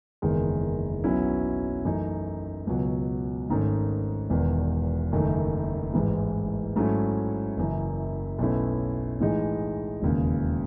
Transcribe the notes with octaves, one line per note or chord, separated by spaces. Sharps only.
F#1 E2 D#3 G#3
B1 B2 F#3 C#4 E4
F#2 E3 A3 D#4
C#2 B2 F#3
G#1 G#2 D#3 A3 C#4
E1 E2 D#3
F#1 F#2 D#3 A3 D#4
A1 G#2 E3 G#3
G#2 F#3 A3 C#4 E4
F#1 F#2 E3
B1 B2 A3 C#4 E4
A2 E3 G#3 D#4
E1 D#2 C#3